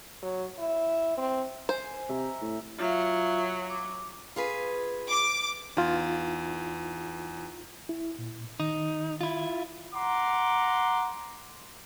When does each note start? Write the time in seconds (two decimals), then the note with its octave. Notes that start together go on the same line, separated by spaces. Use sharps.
0.23 F#3
0.58 E4
1.17 C4
1.69 C5 G#5
2.09 C3 E5 A#5
2.42 A2
2.79 F#3 F4 E5 F5
3.70 D6
4.36 F4 G#4 B4
5.08 D6
5.77 E2 D#4 F4
7.89 E4
8.19 A#2
8.60 D#3 D#4
9.21 E4 F4
9.94 F#5 A#5 C6 D6